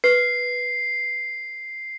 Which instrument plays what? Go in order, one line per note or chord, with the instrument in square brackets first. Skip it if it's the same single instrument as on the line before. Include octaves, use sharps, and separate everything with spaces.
[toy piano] B4 [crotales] C7